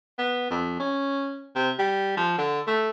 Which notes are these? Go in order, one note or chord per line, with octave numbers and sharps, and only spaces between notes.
B3
F2
C#4
C3
G3
F3
D3
A3